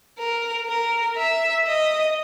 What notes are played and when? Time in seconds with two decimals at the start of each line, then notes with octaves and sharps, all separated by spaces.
0.19 A#4
0.68 A#4
1.17 E5
1.67 D#5